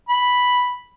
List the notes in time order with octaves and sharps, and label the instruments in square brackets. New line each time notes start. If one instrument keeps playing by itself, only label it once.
[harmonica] B5